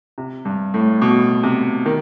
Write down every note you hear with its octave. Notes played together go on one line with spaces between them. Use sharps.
C3
G2
A2
B2
C3
D#3